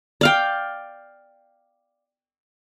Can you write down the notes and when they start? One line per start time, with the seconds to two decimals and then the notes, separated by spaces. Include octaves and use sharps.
0.21 D5 F5 G5